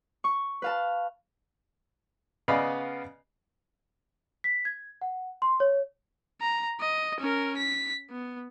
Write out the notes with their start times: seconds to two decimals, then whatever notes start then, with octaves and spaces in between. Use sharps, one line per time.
0.24 C#6
0.62 B4 F5 A5
2.48 C#3 B3 D5 D#5 F5 B5
4.44 B6
4.65 G#6
5.02 F#5
5.42 C6
5.60 C#5
6.41 A#5
6.79 D#5
7.20 C#4 A#4
7.57 B6
8.10 B3